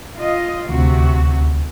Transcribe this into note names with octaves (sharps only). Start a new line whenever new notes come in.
F4 D#5
D2 C3 F#4